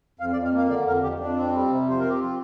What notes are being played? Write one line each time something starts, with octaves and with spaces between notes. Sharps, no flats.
F2 F5
D5
F2
F5
A#3
F5
D3 D5
F2 A#4
F2 G4
F2 D4
C4
G3
C3
F2 C5
C4 A#4
G4
F4